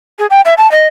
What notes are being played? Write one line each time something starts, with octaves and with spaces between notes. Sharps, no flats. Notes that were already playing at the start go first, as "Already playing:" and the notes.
G#4
G5
E5
A5
D#5